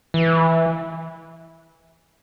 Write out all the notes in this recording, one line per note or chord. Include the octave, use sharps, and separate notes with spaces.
E3